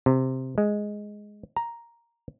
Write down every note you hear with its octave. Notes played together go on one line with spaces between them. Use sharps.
C3
G#3
A#5